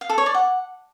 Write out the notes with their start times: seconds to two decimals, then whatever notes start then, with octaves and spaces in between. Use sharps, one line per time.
0.01 F5
0.09 A4
0.18 C#5
0.26 D5
0.34 F#5